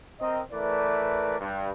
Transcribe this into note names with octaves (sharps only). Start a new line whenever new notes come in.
C4 A#4 D#5
E3 A3 A#4 B4 D5
G2